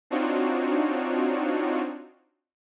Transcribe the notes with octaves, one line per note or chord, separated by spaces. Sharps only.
C4 D4 D#4 F4 F#4 C#5